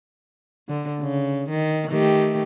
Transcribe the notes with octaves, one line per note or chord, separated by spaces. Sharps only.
D3
C#3
D#3
D#3 A3 G4